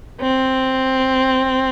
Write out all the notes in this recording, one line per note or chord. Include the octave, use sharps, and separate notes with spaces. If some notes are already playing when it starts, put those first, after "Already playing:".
C4